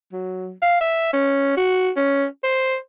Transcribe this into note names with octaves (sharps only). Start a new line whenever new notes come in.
F#3
F5
E5
C#4
F#4
C#4
C5